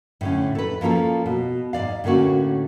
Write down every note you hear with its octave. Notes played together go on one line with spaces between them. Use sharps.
A2 D3 C#4
A4 B4
F3 A#3 C#4 F4 A4
B2
G#2 D5 F5
A2 D3 A#3 C#4 F#4